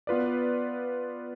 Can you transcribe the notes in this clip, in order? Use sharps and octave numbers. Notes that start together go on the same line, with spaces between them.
B3 F4 B4 D5